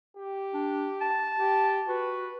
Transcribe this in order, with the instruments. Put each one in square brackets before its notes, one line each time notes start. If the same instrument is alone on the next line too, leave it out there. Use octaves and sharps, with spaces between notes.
[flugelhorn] G4
[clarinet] D4
A5
[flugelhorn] G4
[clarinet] F#4 [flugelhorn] B4